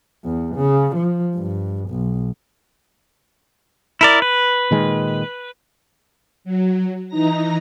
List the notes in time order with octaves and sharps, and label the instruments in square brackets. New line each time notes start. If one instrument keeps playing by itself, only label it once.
[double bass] E2
C#3
F3
G2
B1
[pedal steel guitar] E4 A#4 D5
B4
[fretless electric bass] A#2 D#3 G#3
[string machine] F#3
E3 D#4 A#5 A#6